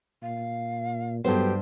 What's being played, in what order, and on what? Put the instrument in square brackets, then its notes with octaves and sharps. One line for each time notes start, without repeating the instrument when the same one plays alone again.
[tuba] A#2 [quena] F5
[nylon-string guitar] G2 C5 [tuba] F#3 [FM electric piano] B3 A4 [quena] G4